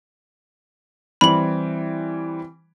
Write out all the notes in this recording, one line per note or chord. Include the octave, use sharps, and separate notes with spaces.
E3 G3 C4 B5 F#7